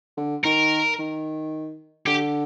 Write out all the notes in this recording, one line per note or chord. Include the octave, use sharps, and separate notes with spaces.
D3
D#3 A#4
D#3
D3 G4